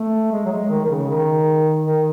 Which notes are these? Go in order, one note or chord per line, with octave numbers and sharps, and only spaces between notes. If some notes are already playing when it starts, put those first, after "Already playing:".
Already playing: A3
G#3
F#3
G#3
D#3
D#3
C#3
D#3
D#3